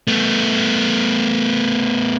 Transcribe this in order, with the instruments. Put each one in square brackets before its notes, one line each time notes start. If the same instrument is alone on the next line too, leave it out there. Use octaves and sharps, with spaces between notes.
[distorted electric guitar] A3 B3